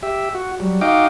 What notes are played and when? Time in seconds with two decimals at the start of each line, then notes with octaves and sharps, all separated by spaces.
0.03 G4 E5
0.35 F#4
0.60 F#3 G3
0.81 D#4 F#4 D#5 F5 G5 D6